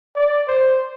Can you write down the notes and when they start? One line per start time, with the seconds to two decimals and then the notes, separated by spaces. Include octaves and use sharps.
0.15 D5
0.48 C5